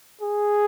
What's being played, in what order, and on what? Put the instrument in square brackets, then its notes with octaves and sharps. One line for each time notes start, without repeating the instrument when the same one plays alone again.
[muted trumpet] G#4